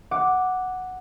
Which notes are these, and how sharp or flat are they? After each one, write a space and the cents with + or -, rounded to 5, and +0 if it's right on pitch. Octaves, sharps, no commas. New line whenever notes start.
F#5 +0 D6 +0